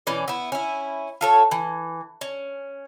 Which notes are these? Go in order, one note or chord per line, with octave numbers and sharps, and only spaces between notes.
B2 E3 C#4 D5
B3 E4
C#4 E4
F4 A4 C#5
E3
C#4